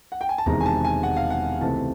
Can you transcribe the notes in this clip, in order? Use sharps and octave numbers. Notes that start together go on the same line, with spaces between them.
F#5
G5
G#5
A5
E1 E2 C3 D#3 G#3 A#5
G#5
A5
G#5
F#5
F5
F#5
C#2 C3 E3 A3 C4 A5